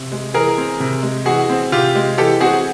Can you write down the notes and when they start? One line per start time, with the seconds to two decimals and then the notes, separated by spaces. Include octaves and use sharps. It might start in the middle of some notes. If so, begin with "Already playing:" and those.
Already playing: C3
0.12 G#3
0.34 E3 G#4 A#4
0.58 C4
0.80 C3
1.03 G#3
1.26 E3 F#4 G#4
1.50 C4
1.72 C3 F4 G4
1.95 G#3
2.18 E3 G4 A4
2.41 C4 F#4 G#4